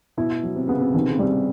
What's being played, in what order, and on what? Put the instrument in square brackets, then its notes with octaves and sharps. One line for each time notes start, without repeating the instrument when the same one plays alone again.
[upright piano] B2 [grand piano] E4
[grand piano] F#3
[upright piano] C3
[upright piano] C#3 [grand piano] B3
[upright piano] C3
[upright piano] B2 [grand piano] D#3
[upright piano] C#3
[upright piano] C3 [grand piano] G3